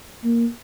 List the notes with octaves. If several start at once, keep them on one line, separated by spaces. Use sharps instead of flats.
A#3